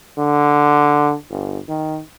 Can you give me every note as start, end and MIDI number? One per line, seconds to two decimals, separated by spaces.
0.18 1.14 50
1.30 1.59 31
1.68 2.00 51